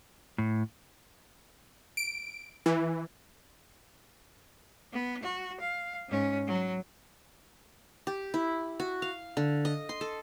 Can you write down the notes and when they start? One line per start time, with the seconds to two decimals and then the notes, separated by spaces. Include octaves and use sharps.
0.38 A2
1.97 D7
2.66 E3
4.93 B3
5.23 F#4
5.61 F5
6.09 G#2 C#4
6.47 F#3
8.07 G4
8.34 E4
8.80 F#4
9.02 F5
9.37 D3
9.65 D#5
9.89 C6
10.01 A4